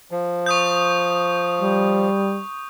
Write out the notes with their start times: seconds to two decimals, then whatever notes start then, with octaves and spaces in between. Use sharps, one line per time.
0.11 F3
0.46 C#6 D#6 G6
1.61 G3